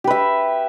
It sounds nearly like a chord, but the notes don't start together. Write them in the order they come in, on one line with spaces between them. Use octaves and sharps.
G4 B4 E5